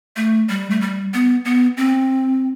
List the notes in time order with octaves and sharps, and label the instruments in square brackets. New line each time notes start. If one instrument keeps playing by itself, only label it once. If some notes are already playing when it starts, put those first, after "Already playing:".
[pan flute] A3
G3
A3
G3
B3
B3
C4